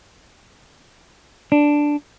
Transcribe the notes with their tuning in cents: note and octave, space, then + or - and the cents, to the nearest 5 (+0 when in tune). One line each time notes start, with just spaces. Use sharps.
D4 +0